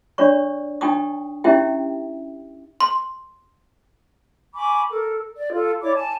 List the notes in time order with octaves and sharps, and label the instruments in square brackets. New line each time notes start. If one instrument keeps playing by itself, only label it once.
[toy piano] D4 C#5 D5 C#6
D4 D#4 G5 A5 C#6 D#6
C#4 D#4 E4 G4 E5 G5
[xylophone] C6
[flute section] G#5 B5 C#6 D6
A4 A#4
D5
F4 A4
E4 C#5 D5 D6
G#5 A5